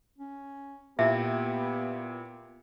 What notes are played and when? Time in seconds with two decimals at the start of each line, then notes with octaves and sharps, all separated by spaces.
0.18 C#4
0.99 A#2 B3 E4 G4 E5